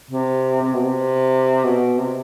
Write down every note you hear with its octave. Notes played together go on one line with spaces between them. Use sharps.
C3
C3
B2
C3
B2
C3